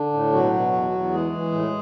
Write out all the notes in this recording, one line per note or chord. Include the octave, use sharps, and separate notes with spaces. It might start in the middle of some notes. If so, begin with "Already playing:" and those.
Already playing: D3 D4
A2
B2 F#3 F#4
B2
E2
E2
E3 G#3 G#4
E3
A2